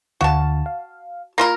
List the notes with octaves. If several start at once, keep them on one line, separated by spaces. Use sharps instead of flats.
D2 D3 F#4 F5 A5
F5
A#3 F4 A#4 B5 A#6